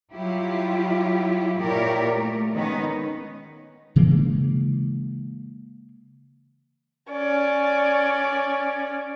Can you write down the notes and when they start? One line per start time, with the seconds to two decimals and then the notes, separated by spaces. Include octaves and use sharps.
0.12 F#3 G3 E4 F4 G4
1.57 A#2 E4 G4 A#4 C#5 D5
2.14 A3
2.52 D#3 G#3 B3 C#4 D#4 B4
3.96 C#3 E3 G#3 A#3
7.10 C#4 D5